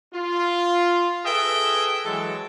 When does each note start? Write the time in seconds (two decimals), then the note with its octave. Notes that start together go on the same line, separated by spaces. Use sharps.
0.13 F4
1.25 G#4 A4 B4 D#5 E5 G5
2.05 E3 F#3 G#3 A4